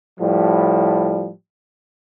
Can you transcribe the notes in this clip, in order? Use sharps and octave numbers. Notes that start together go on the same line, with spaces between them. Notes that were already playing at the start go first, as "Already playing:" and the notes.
A2 F3 G3